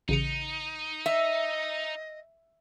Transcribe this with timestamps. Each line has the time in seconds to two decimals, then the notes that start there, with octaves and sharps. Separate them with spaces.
0.09 A1 C#3 D#4 C#7
1.06 D#5 E5